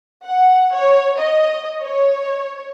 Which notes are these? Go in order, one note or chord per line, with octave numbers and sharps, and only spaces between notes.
F#5
C#5
D#5
C#5